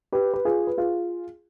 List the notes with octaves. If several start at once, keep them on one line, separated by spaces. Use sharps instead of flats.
G4 B4
B4
F4 G#4
B4
F4 G#4